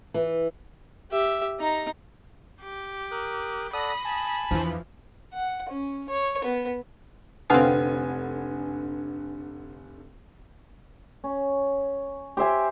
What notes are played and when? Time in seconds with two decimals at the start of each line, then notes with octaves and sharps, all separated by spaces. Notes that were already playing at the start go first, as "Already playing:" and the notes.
0.14 E3
1.12 G4 E5
1.60 D#4 A#5
2.62 G4
3.11 A#4 D#6 F#6
3.73 A4 D5 F#5 B5 D#6 A#6
4.05 G#5 A5
4.51 E2 E3 F3 D4
5.33 F#5
5.69 C#4
6.09 C#5
6.44 B3
7.50 F1 D3 B3 C4 F5 G#5
11.24 C#4
12.37 G4 C5 E5 G#5